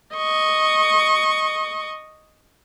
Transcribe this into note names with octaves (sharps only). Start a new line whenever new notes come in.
D#5 C#6